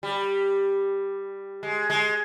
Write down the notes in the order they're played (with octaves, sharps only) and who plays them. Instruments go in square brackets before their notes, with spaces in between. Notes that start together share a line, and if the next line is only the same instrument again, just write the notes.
[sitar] G3
G#3
G#3